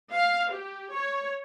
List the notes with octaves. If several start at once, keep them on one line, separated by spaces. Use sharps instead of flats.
F5
G4
C#5